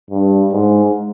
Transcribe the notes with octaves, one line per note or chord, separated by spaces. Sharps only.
G2
G#2